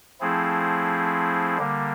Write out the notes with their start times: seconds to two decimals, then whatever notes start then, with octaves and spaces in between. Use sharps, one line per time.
0.21 F3 A3 C4 E4 G#4
1.58 D3 G3 A#3